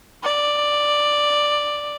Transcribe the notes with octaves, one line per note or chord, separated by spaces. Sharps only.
D5